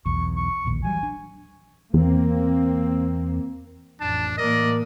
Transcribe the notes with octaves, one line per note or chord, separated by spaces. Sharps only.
B1 E2 C#6
C#6
D1 A#1 D#2
E3 F#3 G3 G#5
D4
E2 A#3 C4
A1 F2 D4 A5
A2 E3 A#3 A#4 D5 D#5